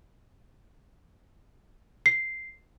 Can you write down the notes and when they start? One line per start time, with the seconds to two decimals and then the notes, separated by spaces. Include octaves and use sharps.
2.06 C7